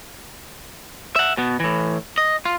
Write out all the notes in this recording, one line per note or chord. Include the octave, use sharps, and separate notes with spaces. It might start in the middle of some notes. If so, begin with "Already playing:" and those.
E5 F#5
B2 B3
A2 E3
D#5
F4